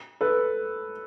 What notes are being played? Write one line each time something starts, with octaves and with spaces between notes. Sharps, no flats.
A4 B4